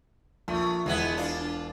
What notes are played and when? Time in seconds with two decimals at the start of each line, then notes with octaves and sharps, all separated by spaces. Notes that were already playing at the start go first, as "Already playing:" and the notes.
0.48 A#1 A3
0.86 E1 G#3 B3 E4
1.17 D4 F4